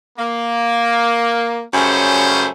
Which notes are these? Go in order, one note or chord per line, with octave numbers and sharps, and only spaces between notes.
A#3
F#2 C#3 G3 A3 C#4 C5